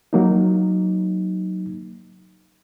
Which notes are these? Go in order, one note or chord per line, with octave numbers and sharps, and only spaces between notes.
F#3 A#3 D#4